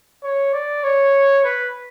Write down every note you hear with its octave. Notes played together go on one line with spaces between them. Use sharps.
C#5
D5
C#5
B4